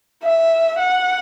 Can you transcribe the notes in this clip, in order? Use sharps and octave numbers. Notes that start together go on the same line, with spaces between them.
E5
F#5